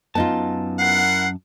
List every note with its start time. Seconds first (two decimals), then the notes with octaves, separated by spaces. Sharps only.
0.15 F#2 B3 D#4 F4 A5
0.79 E4 A#4 F#5 C7